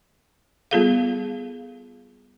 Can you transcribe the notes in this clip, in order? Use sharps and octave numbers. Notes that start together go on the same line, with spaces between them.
G3 B3 F4 G#4 A4 F5